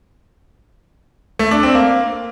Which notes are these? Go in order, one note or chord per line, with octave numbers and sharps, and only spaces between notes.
A3
D4
C4
A#3